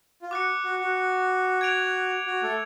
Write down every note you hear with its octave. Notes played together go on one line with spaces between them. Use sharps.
F4
F#4 D6 F#6 C#7
F#4
F#4
G#6 D7 F7
F#4
A3 A4